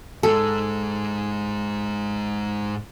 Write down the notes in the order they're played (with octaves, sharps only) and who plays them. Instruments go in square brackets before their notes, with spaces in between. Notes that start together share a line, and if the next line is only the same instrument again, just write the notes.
[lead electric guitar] G#2 G#3 [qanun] A4